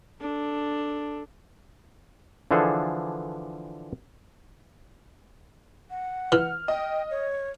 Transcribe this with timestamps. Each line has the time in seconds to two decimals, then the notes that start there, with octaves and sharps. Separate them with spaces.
0.21 D4 A4
2.51 D3 E3 F3 D4 G#4 A4
5.91 F#5
6.32 E3 F6
6.68 D#5 G5
7.11 C#5